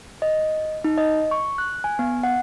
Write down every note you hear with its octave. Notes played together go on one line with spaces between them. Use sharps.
D#5
D#4
D#5
C#6
F#6
G#5
B3
F#5